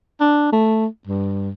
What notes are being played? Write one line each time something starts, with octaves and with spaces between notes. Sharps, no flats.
D4
A3
G2